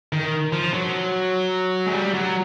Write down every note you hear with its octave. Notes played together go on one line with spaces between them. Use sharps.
D#3
F3
F#3
G#3
G3
F#3